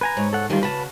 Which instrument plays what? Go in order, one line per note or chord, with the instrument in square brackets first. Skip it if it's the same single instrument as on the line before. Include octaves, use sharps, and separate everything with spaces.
[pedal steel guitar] B4 G#5 A#5
[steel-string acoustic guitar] G#2 C#5
[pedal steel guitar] A4 F#5
[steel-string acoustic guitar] D2 F3 G3 [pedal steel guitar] D#3 F4
[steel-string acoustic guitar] C#3 F#4 [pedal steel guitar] B4 A5